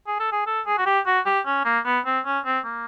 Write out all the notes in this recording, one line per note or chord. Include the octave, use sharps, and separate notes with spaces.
G#4
A4
G#4
A4
G#4
F#4
G4
F#4
G4
C#4
A#3
B3
C4
C#4
C4
A#3